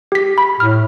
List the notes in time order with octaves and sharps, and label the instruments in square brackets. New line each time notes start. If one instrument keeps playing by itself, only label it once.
[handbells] G4 B6
B5
[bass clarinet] A2 [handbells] F6